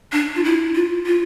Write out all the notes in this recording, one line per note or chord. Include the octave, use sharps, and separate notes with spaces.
D4
F4
E4
F4
F4